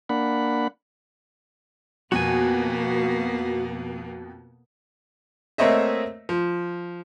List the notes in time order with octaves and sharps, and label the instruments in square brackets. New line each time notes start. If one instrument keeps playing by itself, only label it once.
[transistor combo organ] A#3 D4 F#5 B5
[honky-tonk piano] F2 B2 [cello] A#3 B3 [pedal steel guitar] F#4 G#5
[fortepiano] A3 A#3 C4 C#5 D#5 E5
F3